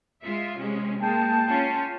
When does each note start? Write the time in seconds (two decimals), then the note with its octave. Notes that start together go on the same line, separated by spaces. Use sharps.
0.23 G#3 F4 E5
0.59 C3 G#3 C#4
1.00 G#3 A#3 G5 A5
1.47 C#4 F4